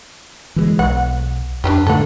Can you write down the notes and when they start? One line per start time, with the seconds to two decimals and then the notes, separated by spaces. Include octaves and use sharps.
0.56 E3 F3 G#3
0.79 B1 F#5
1.64 F2 D4 E4 G4
1.87 G#2 D3 A3 A4 F#5